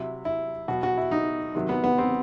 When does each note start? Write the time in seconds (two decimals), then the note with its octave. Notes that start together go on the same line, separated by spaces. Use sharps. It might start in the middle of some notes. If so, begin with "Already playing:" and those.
Already playing: C3 F#3 E4
0.25 E4
0.68 B2 F#3 F#4
0.83 F#4
0.98 E4
1.11 D#4
1.55 C3 D#3 F#3
1.69 B3
1.84 B3
1.98 C4